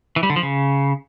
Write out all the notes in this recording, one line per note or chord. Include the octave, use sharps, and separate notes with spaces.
E3
G3
D3
F3
C#3